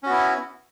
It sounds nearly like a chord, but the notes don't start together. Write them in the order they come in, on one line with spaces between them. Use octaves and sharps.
C#4 F#4 B3 E4